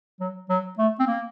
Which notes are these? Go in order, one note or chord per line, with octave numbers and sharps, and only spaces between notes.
F#3
F#3
A3
C4
A#3